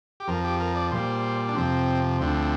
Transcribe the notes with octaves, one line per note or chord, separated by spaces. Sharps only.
G4
F2 F3 A#4
G4
A#4
D5
A#2 G3 C5
D4
F2 C3 F3 C4
D2 D3 F3 C4